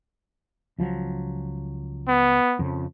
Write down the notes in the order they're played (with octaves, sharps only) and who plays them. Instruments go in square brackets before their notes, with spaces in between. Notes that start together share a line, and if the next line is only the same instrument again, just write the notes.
[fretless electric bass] C#2 F3 F#3
[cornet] B3
[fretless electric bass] F2 C#3 F3